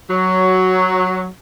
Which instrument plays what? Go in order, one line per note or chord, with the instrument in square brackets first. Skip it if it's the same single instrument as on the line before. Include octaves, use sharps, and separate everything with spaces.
[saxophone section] F#3